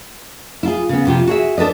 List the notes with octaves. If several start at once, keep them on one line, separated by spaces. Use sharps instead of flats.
E4 F4 G#4
C#3 B3
F2 C3 F4 G4
F#4 G#4 E5
D4 A4 B4 D#5